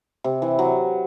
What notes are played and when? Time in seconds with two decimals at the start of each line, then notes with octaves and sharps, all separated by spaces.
0.24 C3
0.42 E3
0.59 F#3